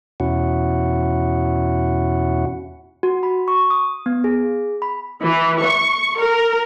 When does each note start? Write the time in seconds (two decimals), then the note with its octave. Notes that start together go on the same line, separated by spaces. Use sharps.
0.20 E2 B2 C#4 E4 F#4 F#5
3.03 F#4
3.23 B5
3.48 C#6
3.70 D#6
4.06 B3
4.24 G#4
4.82 B5
5.22 E3
5.62 C#6
6.20 A#4